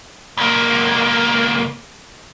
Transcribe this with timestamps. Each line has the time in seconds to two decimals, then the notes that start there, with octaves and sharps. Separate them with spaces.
0.37 C#2 A#3